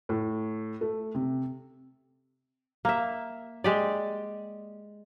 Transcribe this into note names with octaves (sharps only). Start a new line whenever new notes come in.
A2
A3
C3
A#3 E5
G#3 G4 D5